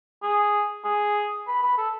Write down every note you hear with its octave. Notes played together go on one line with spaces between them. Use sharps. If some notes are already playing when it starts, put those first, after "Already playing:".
G#4
G#4
B4
B4
A4